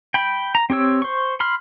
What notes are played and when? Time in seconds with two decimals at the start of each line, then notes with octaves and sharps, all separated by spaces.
0.14 G5 B5
0.55 A#5
0.70 C4 G4 C#5 E6
1.02 C5 C#6
1.40 B5 C6 F6